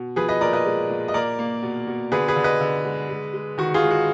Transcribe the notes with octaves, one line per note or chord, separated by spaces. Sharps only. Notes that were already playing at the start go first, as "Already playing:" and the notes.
Already playing: B2
F3 G#4 B4
B4 D#5
A#2 A#4 D5
B4 D#5
G#3
A#2
D#5
A#3 A#4 D5
A#3
B2
B2
D3 G#4 B4
G#4 B4
D3
B4 D#5
D3
G#3
G#3
G#3
D#3 F#4
F4 G#4
G#3
F#4